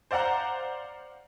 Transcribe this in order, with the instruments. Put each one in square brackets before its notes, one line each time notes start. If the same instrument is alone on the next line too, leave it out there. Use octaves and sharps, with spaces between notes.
[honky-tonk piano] C5 D5 F5 F#5 A#5